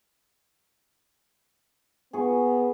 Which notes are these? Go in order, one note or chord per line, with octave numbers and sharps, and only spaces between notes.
B3 G#4 C#6